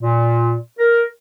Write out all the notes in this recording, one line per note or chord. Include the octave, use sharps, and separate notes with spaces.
A#2
A#4